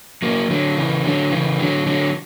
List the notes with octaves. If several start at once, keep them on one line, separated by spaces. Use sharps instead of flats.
F#3 A#3
D3 F#3
C#3 E3
D3 F#3
C#3 E3
D3 F#3
D3 F#3